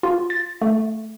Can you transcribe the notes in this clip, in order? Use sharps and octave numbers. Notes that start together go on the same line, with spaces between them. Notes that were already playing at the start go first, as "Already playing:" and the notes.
F4
A6
A3